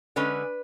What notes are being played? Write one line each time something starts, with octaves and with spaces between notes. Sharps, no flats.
D3 G#3 C#4 B4